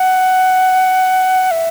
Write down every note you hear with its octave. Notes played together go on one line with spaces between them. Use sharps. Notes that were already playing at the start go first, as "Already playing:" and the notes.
Already playing: F#5
E5